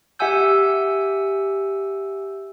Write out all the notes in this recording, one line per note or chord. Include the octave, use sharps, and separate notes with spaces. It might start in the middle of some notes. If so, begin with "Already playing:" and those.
G4 E5 F#5 G#5 E6 G6